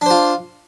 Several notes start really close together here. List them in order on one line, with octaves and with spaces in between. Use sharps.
D4 C5 F4